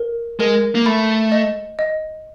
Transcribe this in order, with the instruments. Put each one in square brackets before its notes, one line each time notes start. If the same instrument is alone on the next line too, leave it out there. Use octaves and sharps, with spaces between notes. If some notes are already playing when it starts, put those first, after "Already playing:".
Already playing: [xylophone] A#4
[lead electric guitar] G#3 [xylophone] A#4
[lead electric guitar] A#3
[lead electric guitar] A3 [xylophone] B5
[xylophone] D#5
D#5